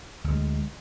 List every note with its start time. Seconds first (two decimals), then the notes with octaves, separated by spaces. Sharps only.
0.24 D2 G#3